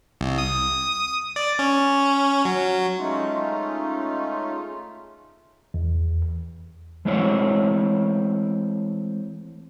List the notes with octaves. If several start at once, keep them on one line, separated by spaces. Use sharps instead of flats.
C2
D#6
D5
C#4
F#3
G#3 A3 C#4 D#4 F4
E2
E3 G#3 A3 C4 E4 C#5